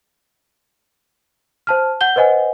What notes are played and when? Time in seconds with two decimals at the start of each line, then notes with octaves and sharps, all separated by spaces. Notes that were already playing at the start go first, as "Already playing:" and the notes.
1.67 C5 A5 F6
2.01 F#5 G6 G7
2.16 B4 C5 D#5 F#5 G#5